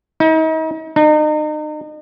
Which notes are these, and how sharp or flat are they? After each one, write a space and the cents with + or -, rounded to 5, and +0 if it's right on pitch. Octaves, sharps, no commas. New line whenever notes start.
D#4 +40
D#4 -35